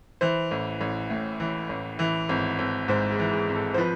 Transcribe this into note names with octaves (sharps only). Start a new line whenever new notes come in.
E3 C5
A1
A1
A2
E3
A1
E3
G#1
G#1
G#2 C5
G#4
E3
G#4
G#1
A4
C5
F3 B4